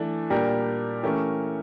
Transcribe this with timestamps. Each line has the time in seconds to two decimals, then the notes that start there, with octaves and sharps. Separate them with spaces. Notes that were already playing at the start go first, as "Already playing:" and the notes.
Already playing: E3 A3 D4
0.30 A#2 G3 D4 G4 A#4
1.03 E3 A3 C#4 G4 A#4